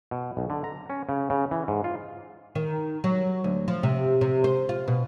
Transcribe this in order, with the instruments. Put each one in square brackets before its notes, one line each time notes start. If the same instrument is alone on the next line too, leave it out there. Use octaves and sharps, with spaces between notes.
[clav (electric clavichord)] B2
B1
D3
A#5
C#4
C#3
C#3
E3
G#2
F4
[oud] D#3
F#3
D2
F3
C3
C3
C5
F4
B2